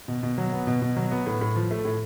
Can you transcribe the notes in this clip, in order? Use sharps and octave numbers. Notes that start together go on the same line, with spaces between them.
B2
B2
F#3
B3
B2
B2
F#3
B3
A2
A2
F3
A3
A2